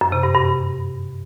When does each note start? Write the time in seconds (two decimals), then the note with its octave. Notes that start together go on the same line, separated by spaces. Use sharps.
0.01 F#2
0.12 C3
0.23 G2
0.34 G2